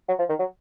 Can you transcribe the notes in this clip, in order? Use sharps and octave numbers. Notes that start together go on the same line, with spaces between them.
F#3
F3
D#3
F#3